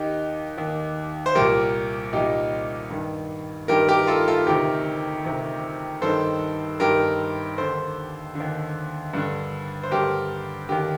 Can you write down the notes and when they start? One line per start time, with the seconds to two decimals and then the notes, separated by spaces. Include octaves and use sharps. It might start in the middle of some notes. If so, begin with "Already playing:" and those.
Already playing: D#2 D#3 D#4 G4
0.57 D#2 D#3
1.26 C5
1.35 C2 A#2 G4 A#4
2.13 C2 A#2 D#4 G4
2.90 G2 D#3
3.68 G2 D#3 G4 A#4
3.88 G4 A#4
4.03 A#4
4.07 F4 A4
4.28 F4 A4
4.47 D2 C3 D#3 G4 A#4
5.25 D2 C3 D#3
6.02 G2 D#3 A4 C5
6.80 G2 D#3 G4 A#4
7.58 D#2 D3 A4 C5
8.35 D#2 D3
9.13 G2 D3
9.83 C5
9.91 G2 D3 G4 A#4
10.69 D#2 D3 G4 A#4